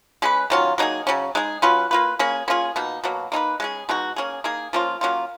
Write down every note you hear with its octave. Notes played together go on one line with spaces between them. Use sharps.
G#3 C#4 G#4 B4
D#3 F#3 C#4 F4
F#3 A#3 D#4 G#4
C#3 F#3 C#4
G#3 D#4 G#4
F#3 C#4 F4 B4
A#3 F4 B4
A#3 C#4 G#4
A#3 C#4 F4 G#4
B2 A#3 D#4
B2 F#3 A#3
A#3 D#4 G#4 B4
G#3 C#4 G#4
B2 G#3 D#4 F#4
A#3 C#4 G#4
A#3 D#4 G#4
F3 A#3 C#4 F4
F#3 A#3 C#4 F4